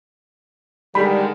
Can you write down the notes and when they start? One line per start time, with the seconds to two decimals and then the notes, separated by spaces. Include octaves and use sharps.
0.95 D3 D#3 G3 G#3 B5